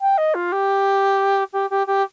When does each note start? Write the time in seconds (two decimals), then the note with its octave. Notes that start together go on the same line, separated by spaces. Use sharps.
0.01 G5
0.18 D#5
0.34 F4
0.52 G4
1.53 G4
1.70 G4
1.87 G4